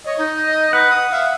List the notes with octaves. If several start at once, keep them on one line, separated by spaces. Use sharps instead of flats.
C#5 D#5
D#4
B4 F#5
D#6
E5 F5